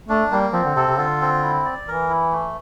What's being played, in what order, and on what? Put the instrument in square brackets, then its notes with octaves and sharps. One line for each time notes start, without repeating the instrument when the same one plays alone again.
[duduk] A3 [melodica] D4
[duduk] G3 [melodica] A#3
[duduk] F3 [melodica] C4
[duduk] D3
[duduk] C3 [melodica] A4
[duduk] C3
[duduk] D3 [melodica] F4
[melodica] C4
E4
D5
[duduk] E3 [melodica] A#4
[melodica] E4
A3